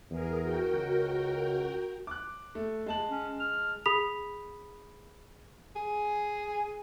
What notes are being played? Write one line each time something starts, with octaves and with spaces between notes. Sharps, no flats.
E2 G#4 A#4
F#4 A#4 G5
C#2
D6 F#6
A3
G#3 A5 F#7
C#4
F6
G#4 B5 D#6 B6 F7
G#4